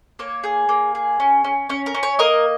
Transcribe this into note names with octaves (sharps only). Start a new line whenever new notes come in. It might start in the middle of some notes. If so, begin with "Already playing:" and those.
A#3 C#5
G#4
A#3
G#4
C#4
C#4
C#4 C#5
A#4
C#4
C#5
A#3 A#4 D#5